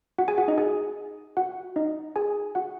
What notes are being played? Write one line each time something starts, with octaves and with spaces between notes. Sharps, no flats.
F#4 F#5
G#4 G#5
F#4 F#5
D#4 D#5
G#4 G#5
F#4 F#5
D#4 D#5
G#4 G#5
F#4 F#5